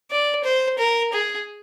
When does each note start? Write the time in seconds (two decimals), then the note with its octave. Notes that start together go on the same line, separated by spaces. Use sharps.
0.11 D5
0.44 C5
0.79 A#4
1.13 G#4